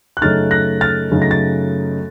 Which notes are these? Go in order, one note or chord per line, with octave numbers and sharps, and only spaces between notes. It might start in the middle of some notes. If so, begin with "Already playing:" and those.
F#6
F#2 C#3 A3 D#4 F6 A6
F#6 A#6
F6 A6
F#2 C#3 A3 D#4
A#6
A6